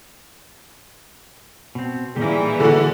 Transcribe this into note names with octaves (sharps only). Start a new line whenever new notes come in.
B2 C4
A#2 D#3 E3 G3 G4 G#4
D3 F#4